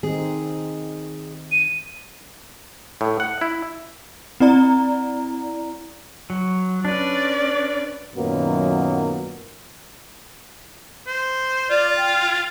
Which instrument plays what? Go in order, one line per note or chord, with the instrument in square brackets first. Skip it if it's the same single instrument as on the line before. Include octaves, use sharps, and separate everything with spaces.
[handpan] D#3 C4 D#4 [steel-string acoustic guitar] G#4
[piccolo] D#7
[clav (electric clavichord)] A2
F#5
E4
[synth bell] C4 E4 D5 A#5
[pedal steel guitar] F#3
[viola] C#4 D5 [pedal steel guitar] D4 B4
[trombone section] F#2 A#2 D#3 F#3 A#3 B3
[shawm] C5
[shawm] F4 [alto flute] D5
[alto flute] G5